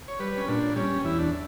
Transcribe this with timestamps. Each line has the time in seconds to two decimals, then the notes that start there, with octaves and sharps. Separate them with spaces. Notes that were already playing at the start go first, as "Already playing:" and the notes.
0.08 C#5
0.19 G3 B4
0.38 C#4
0.48 A#2 D4
0.76 G3 C#4
1.04 E2 E4
1.18 D4